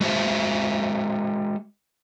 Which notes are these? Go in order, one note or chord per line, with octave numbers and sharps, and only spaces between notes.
G#3 F#4 C5 E5